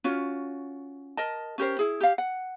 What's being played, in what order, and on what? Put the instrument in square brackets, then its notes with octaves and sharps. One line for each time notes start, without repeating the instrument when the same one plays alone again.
[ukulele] C#4 F4 F#4
A#4 D#5 A5
C#4 G4 A#4 C5
E4 G#4
G4 F5
F#5